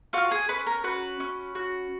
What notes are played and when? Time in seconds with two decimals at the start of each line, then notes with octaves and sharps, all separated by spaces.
0.13 F4 F#4 F5
0.31 G#4 G#5
0.49 C#4 B4
0.67 A#4
0.84 F#4 B4
1.20 C#4
1.55 F#4